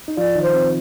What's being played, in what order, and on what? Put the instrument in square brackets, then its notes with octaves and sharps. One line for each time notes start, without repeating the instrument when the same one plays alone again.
[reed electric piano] D#4
[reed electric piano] F3 F4 [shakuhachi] D5
[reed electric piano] D#3 D#4
[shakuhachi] C5
[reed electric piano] C4